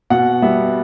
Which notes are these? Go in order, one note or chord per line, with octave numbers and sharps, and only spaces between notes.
B2 F#5
G3 B3 E5